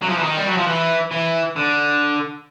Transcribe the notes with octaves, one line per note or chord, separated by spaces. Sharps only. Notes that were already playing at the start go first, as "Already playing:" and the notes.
F#3
F3
E3
D#3
G3
F#3
F3
E3
E3
D3